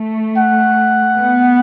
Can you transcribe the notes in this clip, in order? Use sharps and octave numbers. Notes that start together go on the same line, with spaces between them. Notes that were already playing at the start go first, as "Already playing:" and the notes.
Already playing: A3
F#5
B3